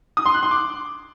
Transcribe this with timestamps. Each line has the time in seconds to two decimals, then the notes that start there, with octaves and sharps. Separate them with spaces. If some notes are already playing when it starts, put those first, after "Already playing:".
0.17 D#6
0.26 C6
0.34 F#6
0.43 C6
0.51 D6